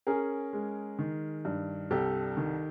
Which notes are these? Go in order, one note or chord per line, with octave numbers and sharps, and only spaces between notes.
C#4 G#4 A#4
G#3
D#3
G2
C2 G4 A4
D#3